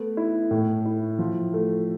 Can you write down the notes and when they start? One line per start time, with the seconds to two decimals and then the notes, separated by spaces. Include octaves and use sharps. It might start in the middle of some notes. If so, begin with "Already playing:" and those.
Already playing: A3 B3
0.17 E4
0.51 A2
0.86 E4
1.19 F3
1.54 A3